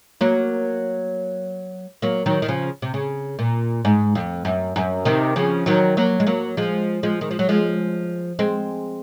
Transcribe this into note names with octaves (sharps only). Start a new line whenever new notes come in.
F#3 A#3
F#3 A#3
D#3 F#3
D#3
C#3 F3
C3
C#3
A#2
G#2
F2
F#2
F#2
C3 D#3
C#3 F3
D#3 F#3
F#3 A#3
G#3
F#3 A#3
F3 G#3
F3 G#3
D#3
F3
F#3
F3 G#3
G#3 C4